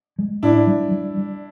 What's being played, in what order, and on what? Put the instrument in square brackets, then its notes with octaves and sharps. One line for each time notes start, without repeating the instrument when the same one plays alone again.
[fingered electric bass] G#3
[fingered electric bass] A2 [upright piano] D4 E4
[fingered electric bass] G3
G3
G3